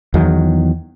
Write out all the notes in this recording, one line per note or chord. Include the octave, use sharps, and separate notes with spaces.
E2 D#3 F#3